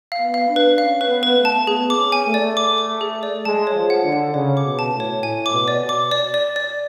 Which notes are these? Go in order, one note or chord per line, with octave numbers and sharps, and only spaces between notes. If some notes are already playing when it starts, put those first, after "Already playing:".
F5
B3
F5
D4
B4
C#4 F5
B4
B3
B4
A3
A5
B3 G#4
D6
C#4
G#5
A3
D5
D6
D6
G#4
D5
G#3 A5
C#5
F3
F#5
D3
F#5
C#3 C#5
D6
B2
A5
A2
C#5
A2 G#5
D6
B2
D5
B2
D6
D5
D5
D5